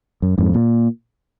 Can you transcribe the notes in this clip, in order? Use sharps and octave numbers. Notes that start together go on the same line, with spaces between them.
F#2
F2 G#2
A#2